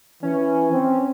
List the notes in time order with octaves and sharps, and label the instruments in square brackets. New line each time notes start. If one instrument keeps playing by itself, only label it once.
[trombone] E3 [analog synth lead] C#4
[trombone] C4